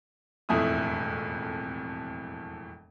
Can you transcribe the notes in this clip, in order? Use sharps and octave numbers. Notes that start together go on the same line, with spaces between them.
E1 F2 A2 A3 E5 D#6